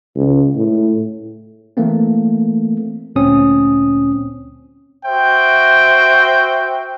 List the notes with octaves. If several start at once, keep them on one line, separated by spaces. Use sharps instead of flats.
C#2
A2
E3 A3 A#3 C4
D2 A#2 C4 C#4 D#6
F#4 C5 E5 G5